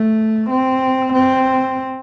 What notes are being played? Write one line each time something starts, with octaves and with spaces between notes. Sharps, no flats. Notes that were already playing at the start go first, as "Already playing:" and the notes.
Already playing: A3
C4
C4